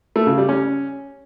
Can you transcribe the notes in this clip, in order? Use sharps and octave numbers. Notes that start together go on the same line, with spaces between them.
A3
C#3
G3
C#4